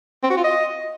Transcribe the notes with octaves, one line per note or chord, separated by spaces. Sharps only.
C4
F#4
F4
D#5